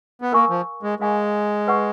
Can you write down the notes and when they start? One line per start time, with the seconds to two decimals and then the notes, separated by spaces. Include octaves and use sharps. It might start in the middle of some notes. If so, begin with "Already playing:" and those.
0.22 B3
0.33 A#3 A#4 F5 G#5 C#6
0.50 F3
0.83 G#3
1.00 G#3 A#4 F5 G#5 C#6
1.68 B4 F#5 C#6